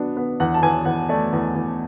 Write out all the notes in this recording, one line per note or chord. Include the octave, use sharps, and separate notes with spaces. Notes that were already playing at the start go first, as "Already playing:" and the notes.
Already playing: F#3 B3 D4
B3
E2 F#5
A5
E2 G#5
E2 F#5
A3 D5
E2
E2